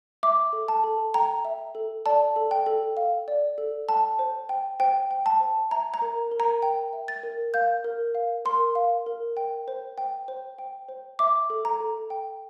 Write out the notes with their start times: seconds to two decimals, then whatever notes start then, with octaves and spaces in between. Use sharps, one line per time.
0.23 E5 D6
0.53 A4
0.68 A5
0.84 A4
1.14 G5 A#5
1.45 E5
1.75 A4
2.06 D5 A5
2.36 A4
2.51 G5
2.66 A4
2.97 F5
3.28 D5
3.58 A4
3.88 G5 A5
4.19 C5
4.49 G5
4.80 C5 G5
5.11 G5
5.26 A5
5.40 C5
5.71 E5 A#5
5.94 A#5
6.02 A#4
6.31 A#4
6.40 A#5
6.62 G5
6.93 E5
7.08 A6
7.23 A#4
7.54 F5 G6
7.84 A#4
8.15 F5
8.45 A#4 C6
8.75 F5
9.06 A#4
9.37 G5
9.68 C5
9.98 G5
10.28 C5
10.59 G5
10.89 C5
11.19 E5 D6
11.50 A4
11.65 A#5
11.80 A4
12.10 G5